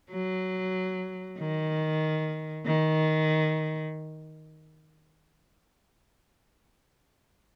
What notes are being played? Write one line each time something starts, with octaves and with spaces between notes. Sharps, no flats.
F#3
D#3
D#3